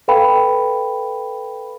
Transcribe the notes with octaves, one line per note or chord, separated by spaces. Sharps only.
A4 B4 F5 G5 B5